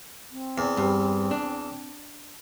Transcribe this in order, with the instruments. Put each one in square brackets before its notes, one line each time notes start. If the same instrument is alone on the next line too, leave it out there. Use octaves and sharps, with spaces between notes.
[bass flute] C4
[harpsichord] E2
[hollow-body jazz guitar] G2
D4